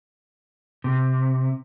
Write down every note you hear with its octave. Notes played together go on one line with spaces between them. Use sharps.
C3